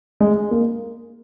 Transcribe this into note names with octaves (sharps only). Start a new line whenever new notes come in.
G#3
A#3